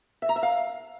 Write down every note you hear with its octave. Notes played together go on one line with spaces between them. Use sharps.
E5
A#5
E5
F5